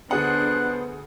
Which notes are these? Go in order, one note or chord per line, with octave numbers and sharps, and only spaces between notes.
D2 B3 D4 G#4 C5 F#5 F#6